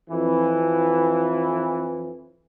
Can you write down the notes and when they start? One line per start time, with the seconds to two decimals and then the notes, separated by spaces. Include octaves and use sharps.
0.10 F2 E3